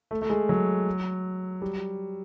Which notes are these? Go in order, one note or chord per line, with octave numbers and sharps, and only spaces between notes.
A3
A3
G#3
F#3
G3